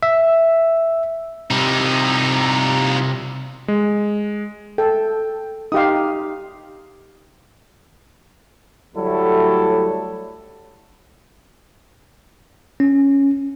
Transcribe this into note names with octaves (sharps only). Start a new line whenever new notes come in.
E5
C3 F3 G3 D#4
G#3
A4 G5
D#4 G4 F5 D#6
D2 F#3 G3 A3 E4 A4
C#4